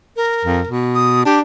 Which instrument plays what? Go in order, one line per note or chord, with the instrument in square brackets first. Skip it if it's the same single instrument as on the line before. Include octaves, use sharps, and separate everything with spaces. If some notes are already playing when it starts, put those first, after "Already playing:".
[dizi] A#4
[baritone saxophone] F2
B2
[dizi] D#6
[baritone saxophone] D4 [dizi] G4